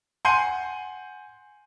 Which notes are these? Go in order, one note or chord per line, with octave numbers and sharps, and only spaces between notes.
F#5 G#5 C6 G6 C7 D#7